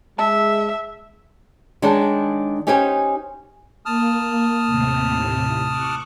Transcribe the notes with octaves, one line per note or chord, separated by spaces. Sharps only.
G#3 E5 A5
D#3 G#3 D4 D#4 C#5 A5
C#4 D#4 G4 C5 C#5 G#5
A#3 A5 D#6 F6
D#2 A2 C3
C#6 D6 F#6